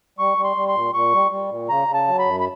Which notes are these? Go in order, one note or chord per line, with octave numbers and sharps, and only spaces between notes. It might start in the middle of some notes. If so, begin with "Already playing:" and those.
G3 C#6
G3
C6
G3
C6
A#2
A#2 C#6
G3
G3
A#2
C#3 A#5
C#3
A5
F#3
B5
F#2
B5